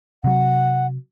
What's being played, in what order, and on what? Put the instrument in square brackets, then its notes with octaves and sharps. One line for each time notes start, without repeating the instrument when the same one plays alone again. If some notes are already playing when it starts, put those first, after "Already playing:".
[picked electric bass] C3 F#3 [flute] F#5